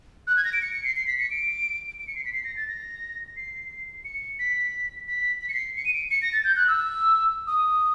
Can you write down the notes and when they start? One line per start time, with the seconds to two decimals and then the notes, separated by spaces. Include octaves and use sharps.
0.27 F#6
0.36 G#6
0.44 A#6
0.53 D7
0.62 C#7
0.73 C#7
0.84 C7
0.96 C7
1.07 B6
1.19 C#7
1.30 D7
1.99 D7
2.07 C#7
2.15 C7
2.25 B6
2.33 C7
2.44 A#6
2.56 A6
2.68 A#6
3.36 C7
4.05 C#7
4.39 B6
5.08 B6
5.41 B6
5.49 C#7
5.54 C7
5.77 C#7
5.85 D#7
5.94 D7
6.11 C#7
6.22 A#6
6.33 A6
6.44 G6
6.56 F#6
6.68 E6
7.47 D#6